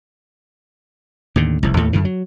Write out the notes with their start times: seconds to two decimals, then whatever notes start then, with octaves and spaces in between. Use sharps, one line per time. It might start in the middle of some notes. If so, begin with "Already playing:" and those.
1.36 D#2 A2 D3
1.63 F1 C2
1.77 D#2 A2 A3
1.93 F#2 D3 E3
2.05 F#3